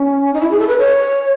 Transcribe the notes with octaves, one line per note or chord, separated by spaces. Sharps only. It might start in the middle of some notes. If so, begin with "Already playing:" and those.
Already playing: C#4
D#4
E4
G#4
A4
B4
C#5